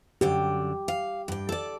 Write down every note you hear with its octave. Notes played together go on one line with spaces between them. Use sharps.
F#2 D3 G4 G5
F5
G2 G5
A4 D5